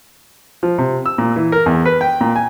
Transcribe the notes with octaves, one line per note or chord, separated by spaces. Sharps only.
F3
C3
E6
A#2
E3
A#4
E2
B4
G5
A#2
G#5